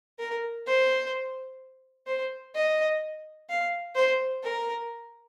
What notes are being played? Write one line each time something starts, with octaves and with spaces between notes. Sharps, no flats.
A#4
C5
C5
D#5
F5
C5
A#4